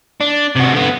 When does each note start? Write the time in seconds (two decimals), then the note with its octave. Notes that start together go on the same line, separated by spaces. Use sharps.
0.21 D4
0.56 C3 F#4
0.72 D3 B3